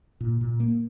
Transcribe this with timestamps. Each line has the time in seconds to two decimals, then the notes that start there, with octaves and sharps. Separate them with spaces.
0.21 A#2
0.41 A#2
0.60 A#3